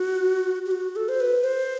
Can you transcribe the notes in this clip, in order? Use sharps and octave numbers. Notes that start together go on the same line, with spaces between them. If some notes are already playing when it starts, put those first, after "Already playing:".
Already playing: F#4
G4
F#4
A4
C5
B4
C5